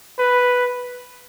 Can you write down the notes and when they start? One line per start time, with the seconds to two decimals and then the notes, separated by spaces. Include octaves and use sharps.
0.19 B4